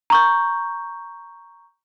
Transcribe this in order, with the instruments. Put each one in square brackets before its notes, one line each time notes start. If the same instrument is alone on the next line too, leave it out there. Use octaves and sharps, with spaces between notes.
[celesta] A#5 C#6 G6